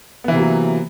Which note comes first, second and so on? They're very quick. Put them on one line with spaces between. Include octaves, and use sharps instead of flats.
B3 E3 C3 A#3 F#3